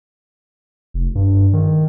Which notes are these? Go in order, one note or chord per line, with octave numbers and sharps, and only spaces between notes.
F1
G2
D#3